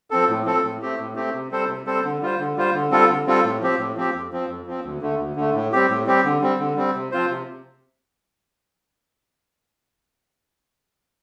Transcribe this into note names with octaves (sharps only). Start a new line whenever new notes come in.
F3 C4 A4
A2
F3 C4 A4
A2
A3 C4 G4
A2
A3 C4 G4
C3
G3 C4 A4 C5
C3
G3 C4 A4 C5
D3
G3 F4 C5
D3
G3 F4 C5
D3
G3 C4 F4 A4
D3
G3 C4 F4 A4
A2
F3 C4 G4
A2
F3 C4 G4
F2
F3 C4
F2
F3 C4
D2
D3 A3
D2
D3 A3
A2
G3 C4 G4
A2
G3 C4 G4
D3
G3 C4
D3
G3 C4
C3
F3 C4 F4 C5
C3